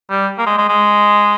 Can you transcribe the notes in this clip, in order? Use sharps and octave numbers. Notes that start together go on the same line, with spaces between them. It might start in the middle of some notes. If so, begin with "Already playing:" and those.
G3
A#3
G#3
G#3
G#3